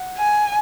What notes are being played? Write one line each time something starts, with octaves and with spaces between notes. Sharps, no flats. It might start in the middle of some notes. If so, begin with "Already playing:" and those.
Already playing: F#5
G#5